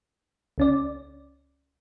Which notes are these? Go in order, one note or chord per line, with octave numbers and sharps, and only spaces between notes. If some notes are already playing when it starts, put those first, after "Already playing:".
C#2 C#4 D5